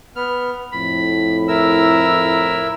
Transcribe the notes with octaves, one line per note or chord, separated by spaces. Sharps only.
B3 F6
F2 A2 B5
E4 A#4 E6